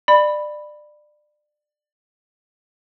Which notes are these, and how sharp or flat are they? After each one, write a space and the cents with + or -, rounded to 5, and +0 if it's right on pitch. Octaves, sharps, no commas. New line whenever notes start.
D5 +25 B5 +0